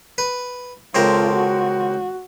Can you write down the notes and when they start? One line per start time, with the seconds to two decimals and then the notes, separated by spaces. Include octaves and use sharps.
0.18 B4
0.95 C#2 C4 F4 A4 A#4
1.34 F#4